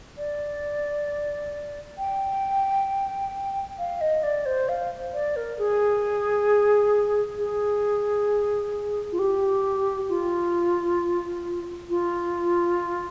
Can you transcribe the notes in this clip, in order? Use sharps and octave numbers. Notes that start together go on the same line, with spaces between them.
D5
G5
F5
D#5
D5
C5
F5
D5
A#4
G#4
G#4
F4
G4
F4
F4